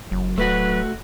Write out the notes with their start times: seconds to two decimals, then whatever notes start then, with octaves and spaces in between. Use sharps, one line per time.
0.11 F#1 F#3
0.38 D1 A3 F#4 B4